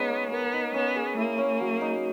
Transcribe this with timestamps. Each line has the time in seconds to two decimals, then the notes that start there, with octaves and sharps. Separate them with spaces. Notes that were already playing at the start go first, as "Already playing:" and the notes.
Already playing: G#3 B3 C#4 D#4
0.10 D#5
0.32 B3 A#4
0.54 D#4
0.74 B3 C#4
0.96 G#4
1.16 A#3 E4
1.38 C#4
1.60 F#3
1.81 D#4